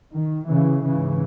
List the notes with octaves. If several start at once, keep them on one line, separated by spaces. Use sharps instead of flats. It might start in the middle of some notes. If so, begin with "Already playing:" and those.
D#3
C#3 E3
G#2 C#3 E3